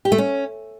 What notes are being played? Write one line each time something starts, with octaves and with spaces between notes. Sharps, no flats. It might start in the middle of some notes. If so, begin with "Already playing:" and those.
G4
A3
C#4